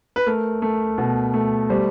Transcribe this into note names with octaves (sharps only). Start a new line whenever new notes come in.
B4
A3 A#4
A3
B2
A3
G3 C5